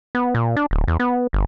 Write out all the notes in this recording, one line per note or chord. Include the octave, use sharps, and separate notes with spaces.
B3
A#2
D4
D1
E2
B3
G1